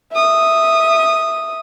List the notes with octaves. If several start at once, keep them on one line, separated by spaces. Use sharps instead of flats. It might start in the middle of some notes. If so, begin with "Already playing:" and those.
E5 D#6